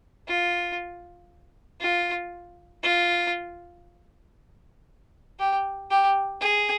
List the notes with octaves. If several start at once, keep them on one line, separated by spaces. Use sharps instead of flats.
F4
F4
F4
G4
G4
G#4